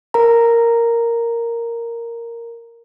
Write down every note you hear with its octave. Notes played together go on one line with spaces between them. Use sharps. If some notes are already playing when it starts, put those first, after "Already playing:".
A#4 A#5